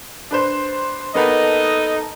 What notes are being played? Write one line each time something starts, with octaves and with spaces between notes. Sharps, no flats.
D4 B4 C5
A#3 B3 D#4 A4 B4 D#5